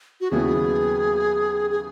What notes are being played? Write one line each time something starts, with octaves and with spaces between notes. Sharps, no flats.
F#4
D#2 C#3 F#3 B3 E4 G#4
G#4